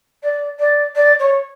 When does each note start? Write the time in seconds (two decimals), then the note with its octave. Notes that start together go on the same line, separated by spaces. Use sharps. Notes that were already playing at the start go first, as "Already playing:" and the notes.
0.23 D5
0.59 D5
0.95 D5
1.19 C#5